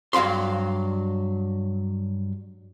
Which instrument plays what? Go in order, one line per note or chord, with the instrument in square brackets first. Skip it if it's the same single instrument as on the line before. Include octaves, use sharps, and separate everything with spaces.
[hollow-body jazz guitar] G2 F#3 F5 B5 C6